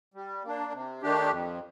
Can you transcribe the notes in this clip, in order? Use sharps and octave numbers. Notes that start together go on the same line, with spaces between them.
G3
A#3 D4
C3
D#3 A3 D4 G4
F2